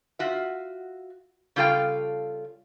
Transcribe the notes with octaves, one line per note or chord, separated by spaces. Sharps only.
F4 F#4 E5
C#3 G3 F4 A4 F5 G5